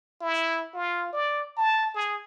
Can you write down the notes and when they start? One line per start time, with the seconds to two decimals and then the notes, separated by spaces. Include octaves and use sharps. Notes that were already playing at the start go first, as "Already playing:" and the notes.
0.21 E4
0.74 F4
1.13 D5
1.57 A5
1.94 G#4